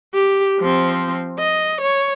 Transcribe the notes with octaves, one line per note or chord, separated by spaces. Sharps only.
G4
F3 C4
D#5
C#5